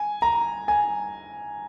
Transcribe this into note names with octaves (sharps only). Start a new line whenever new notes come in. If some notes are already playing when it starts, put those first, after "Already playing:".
Already playing: G#5
A#5
G#5